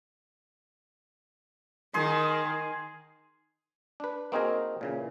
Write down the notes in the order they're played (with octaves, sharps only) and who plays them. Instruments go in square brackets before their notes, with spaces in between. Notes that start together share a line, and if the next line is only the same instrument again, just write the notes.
[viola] D#3 [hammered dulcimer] G#4 C6
[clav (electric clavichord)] D4 B4
A#3 C4 D#4 F#4 G#4 A#4
A#2 C#3 E3